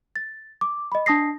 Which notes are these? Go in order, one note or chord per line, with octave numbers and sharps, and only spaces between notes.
A6
D6
D#5 B5
D4 A5 D#6 A#6 C7